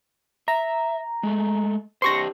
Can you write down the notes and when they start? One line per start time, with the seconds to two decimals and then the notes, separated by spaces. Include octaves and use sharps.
0.48 E5 A#5
1.23 G#3 A3
2.02 D4 G4 C5 C6 C#6 A#6